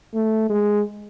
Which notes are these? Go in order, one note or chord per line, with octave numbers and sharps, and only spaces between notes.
A3
G#3